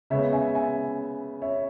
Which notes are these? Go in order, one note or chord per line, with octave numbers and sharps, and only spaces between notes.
C#3 G#3 B3 C#5 E5
E5 G#5
E5 G#5
C#5 E5